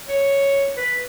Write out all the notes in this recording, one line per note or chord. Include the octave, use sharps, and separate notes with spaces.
C#5
B4